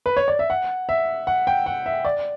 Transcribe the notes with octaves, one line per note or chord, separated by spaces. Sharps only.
B4
C#5
D5
E5
F#5
E5
F#5
G5
F#5
E5
D5